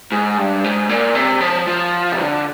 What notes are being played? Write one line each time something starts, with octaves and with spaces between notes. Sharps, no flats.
G#2
G2
G#2
A#2
C3
F3
F3
C3
D3